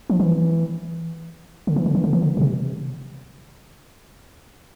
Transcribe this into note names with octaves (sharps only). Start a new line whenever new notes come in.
F3
E3
D3
E3
D3
E3
D3
E3
D3
B2
C3